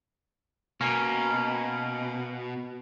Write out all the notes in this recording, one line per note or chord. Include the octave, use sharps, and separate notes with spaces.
B2 A#3 C#4